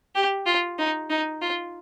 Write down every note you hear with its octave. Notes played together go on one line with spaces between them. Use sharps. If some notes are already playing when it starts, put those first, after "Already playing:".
G4
F4
D#4
D#4
F4